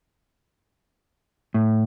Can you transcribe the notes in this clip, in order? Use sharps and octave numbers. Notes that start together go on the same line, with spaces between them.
A2